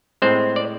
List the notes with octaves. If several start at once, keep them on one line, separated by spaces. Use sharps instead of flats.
A2 G#3 C4 C5
D5